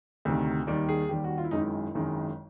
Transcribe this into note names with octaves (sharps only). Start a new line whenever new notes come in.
D2 C3 D#3
D#2 D#3 G3 D5
G#4
D#2 D#3 G3 G4
F#4
F4
E4
G#1 F#2 D#3 G#3 D#4
E4
G#1 F#2 D#3 G#3